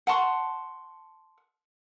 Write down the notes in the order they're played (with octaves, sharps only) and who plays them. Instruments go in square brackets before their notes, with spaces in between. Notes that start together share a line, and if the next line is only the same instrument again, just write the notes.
[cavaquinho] F#5 A5 C6 C#6